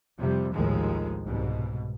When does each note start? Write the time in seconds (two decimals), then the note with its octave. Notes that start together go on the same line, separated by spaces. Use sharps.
0.17 F2 C3 G3
0.53 A#1 D#2 A2 D#3 F3 G#3
1.24 C2 G#2 B2